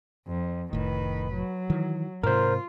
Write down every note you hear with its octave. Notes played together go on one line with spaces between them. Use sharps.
F2
F1 A2 D#3 B4
F#3
D#3 E3
G#2 C3 F4 A#4 C5